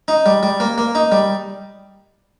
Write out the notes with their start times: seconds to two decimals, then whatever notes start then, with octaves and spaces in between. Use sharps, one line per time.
0.08 D#4
0.26 G3
0.43 G3
0.60 A#3
0.78 A#3
0.95 D#4
1.12 G3